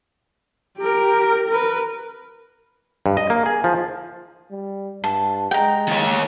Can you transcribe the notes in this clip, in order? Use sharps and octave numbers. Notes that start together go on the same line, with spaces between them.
G4 A#4
A#4 B4
G2
D#5
A#3
G#4
F3
G3
G2 A5
G#3 G5 A#5
D#3 C#5